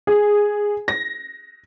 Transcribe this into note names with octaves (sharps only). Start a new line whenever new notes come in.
G#4
A#6